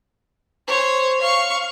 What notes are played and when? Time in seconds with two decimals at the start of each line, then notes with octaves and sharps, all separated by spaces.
0.68 C5 C#5
1.21 F5 C#6